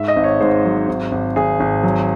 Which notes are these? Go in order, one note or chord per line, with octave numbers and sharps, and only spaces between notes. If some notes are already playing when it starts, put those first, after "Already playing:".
Already playing: G#2 E5
D#5
G#1
C#5
G#2 C5
F#3
G#1
G#1
G#1 G#4
G#1
F#3